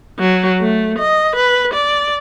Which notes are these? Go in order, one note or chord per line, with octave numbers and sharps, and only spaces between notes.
F#3
A3
D#5
B4
D5